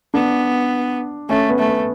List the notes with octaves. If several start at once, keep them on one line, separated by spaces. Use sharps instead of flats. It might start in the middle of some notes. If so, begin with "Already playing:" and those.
B3 D4
A3 C#4
B3
A3
B3